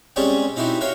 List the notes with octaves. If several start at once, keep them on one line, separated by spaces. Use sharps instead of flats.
G3 G#3 C4 C#4 G4 G#4
C4 D#4 E4 F#4 G4
F#4 A#4 C#5 F5 G5